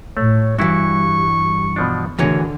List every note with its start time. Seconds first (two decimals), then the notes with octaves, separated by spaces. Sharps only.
0.17 A2 A3 C#5
0.58 G2 E3 G3 E4 F#4 C#6
1.76 B2 F3 D4
2.19 D2 D3 E3 G#4 A#4 C#5 A#5